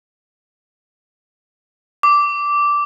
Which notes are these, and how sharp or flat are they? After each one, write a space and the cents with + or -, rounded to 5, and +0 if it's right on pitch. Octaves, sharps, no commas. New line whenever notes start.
D6 -10